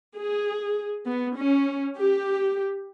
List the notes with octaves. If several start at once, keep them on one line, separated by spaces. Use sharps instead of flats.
G#4
B3
C#4
G4